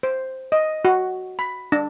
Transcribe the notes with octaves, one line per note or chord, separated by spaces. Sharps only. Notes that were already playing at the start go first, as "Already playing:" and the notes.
C5
D#5
F#4
B5
D4